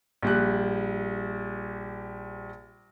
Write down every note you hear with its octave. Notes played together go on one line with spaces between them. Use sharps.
A#1 G3 F#6